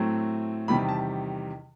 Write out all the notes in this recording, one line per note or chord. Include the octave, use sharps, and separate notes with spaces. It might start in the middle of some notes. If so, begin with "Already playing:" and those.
Already playing: A2 F#3 A3 C4
E2 C3 D#3 G3 B5
A5